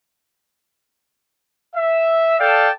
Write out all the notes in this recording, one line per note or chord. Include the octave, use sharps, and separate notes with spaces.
E5
A4 D5 F5 G5 A5